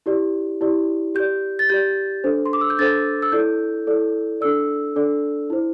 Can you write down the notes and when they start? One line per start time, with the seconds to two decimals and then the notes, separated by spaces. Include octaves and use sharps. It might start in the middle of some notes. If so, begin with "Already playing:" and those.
0.06 E4 G4 D5
0.61 E4 G4 D5
1.15 G4 D5 G6
1.59 A6
1.69 G4 D5 G6
2.24 D4 A4 C5
2.46 C6
2.53 D6
2.61 E6
2.70 G6
2.79 D4 A4 C5 A6
3.23 E6
3.32 E4 A4 D5 G6
3.87 E4 A4 D5
4.41 D4 A4 D5 E6
4.96 D4 A4 D5
5.50 E4 C5